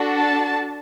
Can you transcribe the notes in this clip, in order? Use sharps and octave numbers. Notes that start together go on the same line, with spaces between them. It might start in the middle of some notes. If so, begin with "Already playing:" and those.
Already playing: D4 F#4 A4
A5